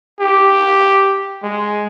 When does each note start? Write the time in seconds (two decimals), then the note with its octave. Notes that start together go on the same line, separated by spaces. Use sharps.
0.20 G4
1.43 G#3